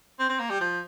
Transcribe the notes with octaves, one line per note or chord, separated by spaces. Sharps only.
C4
C4
A#3
G3
F3